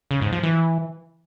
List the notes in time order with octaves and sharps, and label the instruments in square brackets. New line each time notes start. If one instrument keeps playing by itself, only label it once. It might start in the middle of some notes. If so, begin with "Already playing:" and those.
[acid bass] C#3
G#2
F3
E3